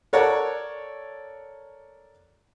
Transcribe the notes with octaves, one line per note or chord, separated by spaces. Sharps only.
A4 A#4 C#5 D5 F#5